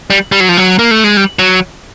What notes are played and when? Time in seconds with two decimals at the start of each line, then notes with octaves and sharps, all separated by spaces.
0.10 G3
0.32 G3
0.40 F#3
0.49 F3
0.57 F#3
0.79 A#3
0.91 A3
1.04 G#3
1.17 G3
1.39 F#3